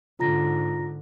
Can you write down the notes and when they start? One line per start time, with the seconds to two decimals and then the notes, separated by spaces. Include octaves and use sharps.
0.19 G#2 D3 F4 A#5 A#6